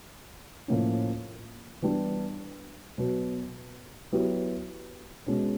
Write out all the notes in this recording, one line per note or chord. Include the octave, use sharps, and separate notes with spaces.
A2 F3 A#3 C#4
E3 G3 B3 D4 G4
B2 F#3 B3
F#3 B3 E4 G4
B2 G#3 C#4